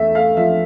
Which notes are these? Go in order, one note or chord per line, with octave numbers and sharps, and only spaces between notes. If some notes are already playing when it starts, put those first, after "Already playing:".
Already playing: E2 A3 E5
A3 F5
F3 E5